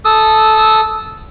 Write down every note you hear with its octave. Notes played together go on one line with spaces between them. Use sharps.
A4 D#6 E6